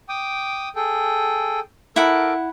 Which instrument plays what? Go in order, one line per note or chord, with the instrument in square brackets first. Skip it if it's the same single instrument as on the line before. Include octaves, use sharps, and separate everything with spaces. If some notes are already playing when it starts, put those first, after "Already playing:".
[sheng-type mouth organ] G5 D6 D#6
G#4 A4 G5
[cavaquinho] E4 F#5 [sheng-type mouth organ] A4 A#4 D6